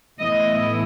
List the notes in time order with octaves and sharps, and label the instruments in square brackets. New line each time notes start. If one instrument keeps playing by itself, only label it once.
[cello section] A2 E3 B3 E4 D#5